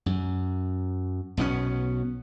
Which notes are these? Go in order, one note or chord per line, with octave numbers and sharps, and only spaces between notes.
F#2
B1 B2 B3 C#4